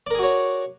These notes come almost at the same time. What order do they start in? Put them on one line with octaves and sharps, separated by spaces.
D5 A#4 G#4 F#4 C#5